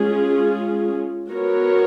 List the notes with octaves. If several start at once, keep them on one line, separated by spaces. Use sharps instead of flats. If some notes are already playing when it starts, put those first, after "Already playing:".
Already playing: G#3 C#4 F4 G#4
B3 F#4 A#4 C#5